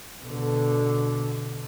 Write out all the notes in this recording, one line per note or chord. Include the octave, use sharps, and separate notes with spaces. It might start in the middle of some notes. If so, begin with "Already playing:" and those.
B2 D3